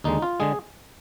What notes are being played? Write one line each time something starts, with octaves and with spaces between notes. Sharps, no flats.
D#2 D3 G#3 D#4
F4
D3 G#3 G#4